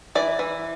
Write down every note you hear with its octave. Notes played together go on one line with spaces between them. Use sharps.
E3 D5
E3